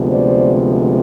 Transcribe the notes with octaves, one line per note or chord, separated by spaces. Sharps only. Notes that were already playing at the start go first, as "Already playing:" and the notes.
Already playing: D2 C3 F3 G#3 B3
C5 D5